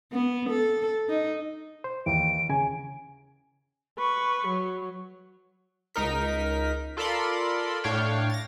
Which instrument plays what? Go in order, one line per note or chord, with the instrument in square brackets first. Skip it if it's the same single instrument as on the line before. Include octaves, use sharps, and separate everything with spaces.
[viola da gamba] B3
A4
D#4
[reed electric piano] C5
[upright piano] D#2 [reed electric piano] E3 [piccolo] D7
[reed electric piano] C#3 [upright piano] G#5
[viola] B4 C#6
F#3
[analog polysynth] C#2 D#4 A#4 B6
F4 A4 A#4 D5 B5 C6
A2 D4 C#5 F5 G5
A6 A#6